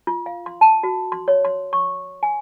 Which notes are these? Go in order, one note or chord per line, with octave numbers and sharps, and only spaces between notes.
F4
F5
C6
A5
F#4
C6
C#5
C6
C#6
G#5